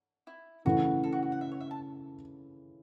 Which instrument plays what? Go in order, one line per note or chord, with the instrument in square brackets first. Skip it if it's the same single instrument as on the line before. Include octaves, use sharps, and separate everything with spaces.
[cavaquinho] E4
[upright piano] C#3 E3 A3 [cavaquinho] F#4
[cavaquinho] A4
F#4
F#4
F#5
E5
C#5
E5
A5